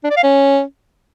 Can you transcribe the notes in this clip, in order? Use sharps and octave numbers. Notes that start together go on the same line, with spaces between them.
D4
D5
F5
C#4